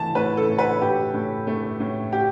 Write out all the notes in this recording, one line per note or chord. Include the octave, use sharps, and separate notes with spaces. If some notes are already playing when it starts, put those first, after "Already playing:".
Already playing: E3 A3 A5
A2 B4
A4
A2
B4
A2 G4
A2
A3
A2
G4